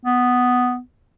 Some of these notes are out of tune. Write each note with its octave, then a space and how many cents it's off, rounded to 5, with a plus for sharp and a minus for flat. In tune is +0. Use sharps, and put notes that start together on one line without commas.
B3 +5